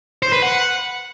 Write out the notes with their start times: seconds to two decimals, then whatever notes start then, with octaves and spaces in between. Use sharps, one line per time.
0.22 C5
0.32 B4
0.42 F#5